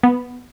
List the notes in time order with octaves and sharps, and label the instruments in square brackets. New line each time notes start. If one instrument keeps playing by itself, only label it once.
[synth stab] B3